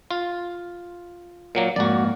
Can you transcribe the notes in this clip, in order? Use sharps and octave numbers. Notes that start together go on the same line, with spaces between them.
F4
A#2 F#3 A#3
F2 G#2 A#3 F#4 D5